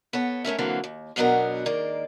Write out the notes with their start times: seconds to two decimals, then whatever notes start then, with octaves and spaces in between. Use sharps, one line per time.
0.13 B3 A4 C#5
0.44 A3 C#4 A#4 E5
0.58 D3 E3 F#3 A#3 C4
0.84 D#2
1.16 F#2 B2 F#3 B3 D4 A#4
1.66 D#3 G#3 A#3 D5